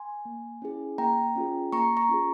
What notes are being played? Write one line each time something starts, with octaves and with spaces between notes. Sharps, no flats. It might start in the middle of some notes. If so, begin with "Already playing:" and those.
Already playing: G#5 C6
A#3
C#4 E4 G#4
A#3 G5 A#5
C#4 F4 G#4
A#3 A#5 C#6
A#5 C#6
C#4 F4 G#4